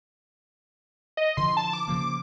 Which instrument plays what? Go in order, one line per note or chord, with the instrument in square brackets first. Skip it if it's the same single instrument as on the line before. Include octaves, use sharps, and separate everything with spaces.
[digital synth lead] D#5
[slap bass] D3 E3 F3 [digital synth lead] C6
[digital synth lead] A5
D6
[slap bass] C#3 F3 A#3